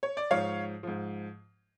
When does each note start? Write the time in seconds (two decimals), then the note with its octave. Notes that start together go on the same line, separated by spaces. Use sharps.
0.03 C#5
0.17 D5
0.31 G#2 F3 C#5 F5
0.83 G#2 F3